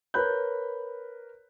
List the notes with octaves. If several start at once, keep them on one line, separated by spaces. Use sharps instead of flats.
A#4 B4 C#5 B5 F#6 G6